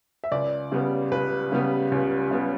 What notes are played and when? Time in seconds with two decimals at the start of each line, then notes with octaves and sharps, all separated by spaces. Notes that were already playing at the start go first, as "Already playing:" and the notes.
0.24 E5
0.32 C#2 D5
0.72 C#3 G3 B3
1.12 C#2 B4
1.52 C#3 G3 B3
1.92 C#2
2.31 C#3 G3 B3